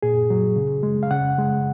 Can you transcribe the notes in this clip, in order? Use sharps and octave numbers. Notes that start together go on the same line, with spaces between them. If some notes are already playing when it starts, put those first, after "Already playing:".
A#2 G#4
F#3
C#3
G#3
F5
C#3 F#5
G#3